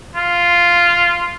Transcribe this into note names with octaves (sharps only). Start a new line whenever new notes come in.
F4